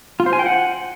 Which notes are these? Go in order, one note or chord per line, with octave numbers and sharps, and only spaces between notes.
F4
C5
G#5
G5
F#5